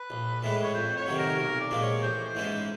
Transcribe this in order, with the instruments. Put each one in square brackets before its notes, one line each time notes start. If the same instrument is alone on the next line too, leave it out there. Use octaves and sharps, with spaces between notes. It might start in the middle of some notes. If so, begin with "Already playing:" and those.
Already playing: [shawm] B4
[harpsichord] A#1
A2 E3 G#3
[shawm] C#5
[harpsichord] F2 [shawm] C5
[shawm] C#5
[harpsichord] C3 D#3 F#3
[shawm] A#4
[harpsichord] B1 [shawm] A#4
[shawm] D5
[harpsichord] A#2 F3 G#3
[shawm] C#5
[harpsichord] A1 [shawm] C5
[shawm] C5
[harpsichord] G#2 E3 G#3 C#4